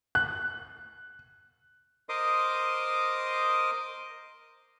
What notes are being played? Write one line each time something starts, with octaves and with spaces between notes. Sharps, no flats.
F#6
A#4 C5 D#5 C6 D6 D#6